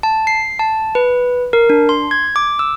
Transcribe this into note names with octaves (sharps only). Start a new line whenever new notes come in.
A5
C7
A5
B4
A#4
D4
C6
G#6
D6
E6